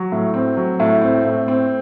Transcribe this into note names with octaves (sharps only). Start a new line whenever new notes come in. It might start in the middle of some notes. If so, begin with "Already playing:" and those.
Already playing: F#3
A2
C4
F#3
A2
C4
A2
C4